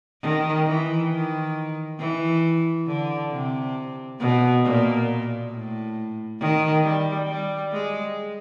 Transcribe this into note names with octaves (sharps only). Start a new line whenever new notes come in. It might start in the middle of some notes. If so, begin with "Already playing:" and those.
D#3
E3
D#3
E3
D3
C3
B2
A#2
A2
D#3
G3
G3
G#3